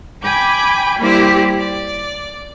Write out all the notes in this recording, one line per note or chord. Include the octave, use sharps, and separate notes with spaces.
G5 G#5 B5 D6 G6
G3 A#3 E4 G4 C5 D5
D5